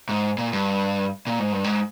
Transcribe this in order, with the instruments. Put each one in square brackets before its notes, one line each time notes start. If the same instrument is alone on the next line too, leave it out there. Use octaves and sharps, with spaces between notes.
[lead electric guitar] G#2
A#2
G2
A#2
G#2
G2
G#2